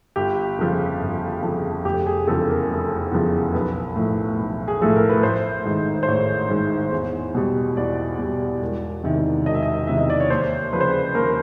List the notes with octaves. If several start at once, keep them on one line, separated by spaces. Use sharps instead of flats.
G1 G4
F2 C#3 F3
G1
F2 C#3 F3
F1 G4
G#4
E2 C#3 F3 A4
A#4
F1
E2 C#3 F3
B1 B4
A2 F3
B1
G#4
A2 F3 A4
A#4
B4
A1 C5
G#2 D#3
C5
A1 C#5
G#2 D#3
E2
B2 G3
E2 D5
B2 G3
E1
E2 C3 D#3
E1 D#5
E5
D#5
E2 C3 D#3 E5
D#5
D5
C#5
D#2 C5
C#3 F3 B4 C5
B4
D#2 A#4